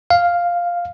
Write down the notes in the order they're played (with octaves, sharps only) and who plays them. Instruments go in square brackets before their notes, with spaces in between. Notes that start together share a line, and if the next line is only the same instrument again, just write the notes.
[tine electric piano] F5